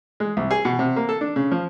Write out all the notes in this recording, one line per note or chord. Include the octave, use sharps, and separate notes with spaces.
G#3
C2
G#4
B2
C3
A#3
A4
D4
C#3
F3